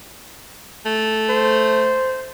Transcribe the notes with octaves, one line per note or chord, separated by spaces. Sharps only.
A3
C5